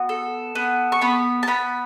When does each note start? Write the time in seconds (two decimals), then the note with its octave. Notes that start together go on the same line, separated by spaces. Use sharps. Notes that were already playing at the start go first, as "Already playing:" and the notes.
Already playing: B3 F#4
0.09 A4
0.55 B3
0.92 C#6
1.01 B3 B5
1.43 A5
1.47 B3 B5